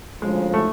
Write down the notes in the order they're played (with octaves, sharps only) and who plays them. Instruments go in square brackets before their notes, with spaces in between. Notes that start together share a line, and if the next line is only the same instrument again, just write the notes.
[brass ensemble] D2 C#3 F3 [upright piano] G#3
[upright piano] A3